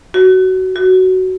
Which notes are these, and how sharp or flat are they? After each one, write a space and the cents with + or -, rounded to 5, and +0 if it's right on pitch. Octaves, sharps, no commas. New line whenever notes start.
F#4 +15
F#4 +10